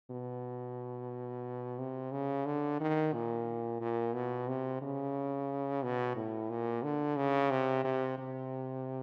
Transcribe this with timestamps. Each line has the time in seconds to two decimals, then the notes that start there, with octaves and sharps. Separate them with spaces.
0.11 B2
1.79 C3
2.12 C#3
2.46 D3
2.80 D#3
3.14 A#2
3.81 A#2
4.14 B2
4.49 C3
4.82 C#3
5.83 B2
6.16 A2
6.50 A#2
6.83 D3
7.17 C#3
7.51 C3
7.84 C3
8.19 C3